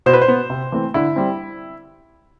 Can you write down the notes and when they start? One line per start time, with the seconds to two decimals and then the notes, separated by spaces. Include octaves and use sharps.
0.06 B2 C5
0.13 B4
0.21 C5
0.28 B3
0.50 C3
0.72 E3 A3 C4
0.94 D3 E4
1.16 G3 C4